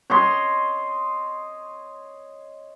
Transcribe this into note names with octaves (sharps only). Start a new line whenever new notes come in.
C#5 D#5 C6